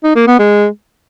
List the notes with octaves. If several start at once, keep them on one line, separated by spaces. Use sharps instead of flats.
D#4
A#3
B3
G#3